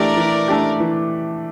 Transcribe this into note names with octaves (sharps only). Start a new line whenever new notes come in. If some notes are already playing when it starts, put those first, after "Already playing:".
Already playing: E3 A3 D4 G4 A#4 D5
E3
A3 D4 G4
E3